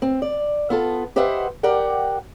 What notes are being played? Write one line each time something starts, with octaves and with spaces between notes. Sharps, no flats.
C4
D5
B3 F4 A4
G4 B4 C5 D#5 E5 F#5
G4 A#4 D5 F#5 G5